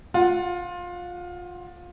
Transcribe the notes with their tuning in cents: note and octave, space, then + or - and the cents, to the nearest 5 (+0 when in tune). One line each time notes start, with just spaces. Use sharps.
F4 +20 F#5 -5